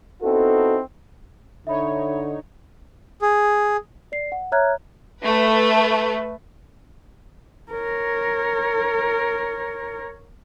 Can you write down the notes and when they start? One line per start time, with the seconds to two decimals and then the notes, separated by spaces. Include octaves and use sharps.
0.22 B3 C4 D#4 E4 F#4 A4
1.67 D3 D#4 C#5 E5 B5
3.22 G#4
4.12 D5 C7
4.32 F#5
4.52 C#5 E5 A#5 F6 F#6 G#6
5.22 A3 B4
7.72 A#4 C#5